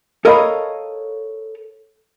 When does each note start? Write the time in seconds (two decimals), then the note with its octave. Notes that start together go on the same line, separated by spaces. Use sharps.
0.25 A4 A#4 C#5 D#5 F5 B5